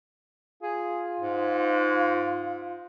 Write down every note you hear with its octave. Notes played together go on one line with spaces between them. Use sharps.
F4 G#4
G#2